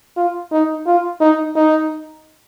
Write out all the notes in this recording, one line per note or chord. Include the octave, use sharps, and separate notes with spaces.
F4
D#4
F4
D#4
D#4